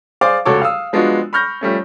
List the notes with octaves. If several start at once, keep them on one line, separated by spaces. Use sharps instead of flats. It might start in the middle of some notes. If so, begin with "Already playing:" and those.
G#4 C5 D5 F5 D6
F1 C#2 F#4 A4 C#5 D6
F5 D#6 E6
F3 G#3 B3 D4 F4 F#4
B5 C#6 F6 G6 A#6
F3 G3 A3 C#4